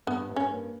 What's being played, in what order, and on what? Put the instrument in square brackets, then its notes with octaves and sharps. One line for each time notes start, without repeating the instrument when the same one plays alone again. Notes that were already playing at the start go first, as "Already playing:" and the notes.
[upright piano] G2 [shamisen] B3
[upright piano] G2
[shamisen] C#4
[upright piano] A#3